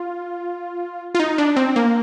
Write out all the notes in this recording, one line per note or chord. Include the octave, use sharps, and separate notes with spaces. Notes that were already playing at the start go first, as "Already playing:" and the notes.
Already playing: F4
F4
D#4
D4
C4
A#3